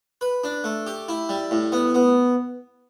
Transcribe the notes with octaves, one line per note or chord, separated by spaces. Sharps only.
B4
D4
A3
G4
E4
G3
A2
B3
B3